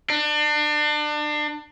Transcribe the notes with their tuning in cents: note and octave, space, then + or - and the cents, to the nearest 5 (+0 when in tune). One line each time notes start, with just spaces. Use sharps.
D4 +30